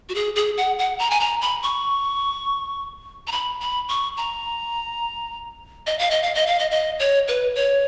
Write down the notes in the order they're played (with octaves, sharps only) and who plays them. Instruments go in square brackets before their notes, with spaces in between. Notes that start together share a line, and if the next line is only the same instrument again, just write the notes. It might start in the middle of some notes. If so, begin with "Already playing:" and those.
[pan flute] F#4
G#4
G#4
F#5
F#5
A#5
G#5
A#5
B5
C#6
A#5
B5
B5
C#6
A#5
D#5
F5
D#5
F5
D#5
F5
D#5
D#5
C#5
B4
C#5